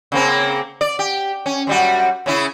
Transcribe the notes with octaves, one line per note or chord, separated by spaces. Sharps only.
C#3 A#3 C4
D5
G4
C#4
F#2 G3 F#4
C#3 C#4 E4